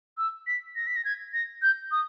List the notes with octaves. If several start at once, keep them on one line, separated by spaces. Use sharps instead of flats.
E6
B6
A#6
B6
A#6
G#6
A#6
G6
D#6